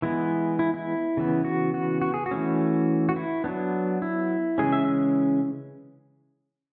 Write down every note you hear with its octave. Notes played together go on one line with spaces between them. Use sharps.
E3 G#3 B3 E4
E4
E4
C#3 E3 B3
F#4
F#4
F#4
G#4
F#4
E3 A3 C#4
F#4
E4
F#3 B3 D4
E4
C#3 E3 G#3 C#4 G#4
E5